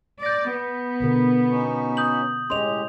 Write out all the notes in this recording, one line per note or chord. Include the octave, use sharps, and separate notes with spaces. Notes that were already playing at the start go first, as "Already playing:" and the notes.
D5 G6 A#6
B3
B2 D3 A#4
C#4 D#4 F#4
D#6 G6 F#7
A2 G#3 C#4 G4 C#5 D#5 C6 F7